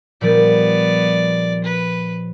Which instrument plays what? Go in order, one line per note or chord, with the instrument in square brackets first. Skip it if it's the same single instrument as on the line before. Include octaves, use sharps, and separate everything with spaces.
[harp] A#2 F3 G3 [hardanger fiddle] B3 D5
[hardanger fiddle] B4